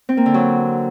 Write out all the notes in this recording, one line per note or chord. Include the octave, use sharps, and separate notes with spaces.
C4
A#3
D3
F#3